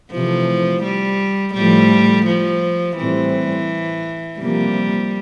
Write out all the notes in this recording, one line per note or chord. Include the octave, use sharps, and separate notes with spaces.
C3 E3 F3 A3
G3
A2 F3 G3 A3
F3
A2 E3 G3 C4
C3 F3 G3 A#3